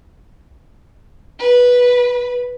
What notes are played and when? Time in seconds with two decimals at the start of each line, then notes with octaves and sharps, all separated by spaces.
1.39 B4